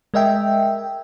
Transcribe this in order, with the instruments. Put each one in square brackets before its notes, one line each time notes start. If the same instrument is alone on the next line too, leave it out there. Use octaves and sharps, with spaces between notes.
[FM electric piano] G#3 A#4 D#5 E5 G5